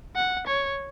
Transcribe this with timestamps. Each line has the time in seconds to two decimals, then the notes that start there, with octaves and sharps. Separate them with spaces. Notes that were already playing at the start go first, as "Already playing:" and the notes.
0.16 F#5
0.47 C#5